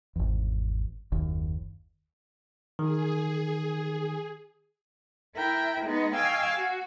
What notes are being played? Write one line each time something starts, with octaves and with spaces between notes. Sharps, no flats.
G#1 E2
F#1 D#2
D#3 G#4
E4 A#4 E5 G5
G#3 B3 D#4 D#5
D#5 F5 G5 G#5 C#6 E6
F#4